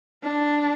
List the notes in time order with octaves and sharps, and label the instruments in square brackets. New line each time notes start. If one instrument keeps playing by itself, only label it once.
[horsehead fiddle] D4